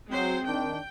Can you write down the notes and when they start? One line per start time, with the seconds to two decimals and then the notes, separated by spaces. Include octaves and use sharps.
0.11 F#3 G#3 C4 C5
0.45 D#3 D4 G5